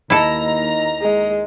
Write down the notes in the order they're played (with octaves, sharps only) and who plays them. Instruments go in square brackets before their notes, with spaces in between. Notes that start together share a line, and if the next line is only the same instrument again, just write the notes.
[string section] D#2 A#5 [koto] E4 A4 [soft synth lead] D#5
[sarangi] G#3